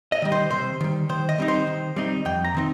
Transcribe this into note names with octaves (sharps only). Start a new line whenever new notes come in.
D#5
D#3 G3
C5
C3 C5
D#3 G3
D#3 C5
D#5
G3 C4 D#4
C5
D#3
G3 C4 D#4
F2 G5
A#5
D#3 C4 D#4